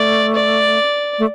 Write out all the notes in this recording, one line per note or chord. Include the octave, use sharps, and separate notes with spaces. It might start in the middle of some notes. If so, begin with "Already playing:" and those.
Already playing: A3 D5
D5
A3